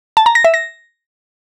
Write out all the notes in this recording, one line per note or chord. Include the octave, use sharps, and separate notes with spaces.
A5
A#5
A#6
E5
A#6